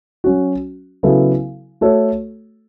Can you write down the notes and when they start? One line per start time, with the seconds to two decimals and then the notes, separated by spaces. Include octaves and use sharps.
0.24 F#3 C#4 F#4
1.03 C#3 F#3 B3 E4 A4
1.81 A3 F#4 A4 C#5